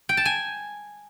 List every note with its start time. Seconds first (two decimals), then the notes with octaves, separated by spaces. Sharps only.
0.09 G5
0.17 A5
0.25 G#5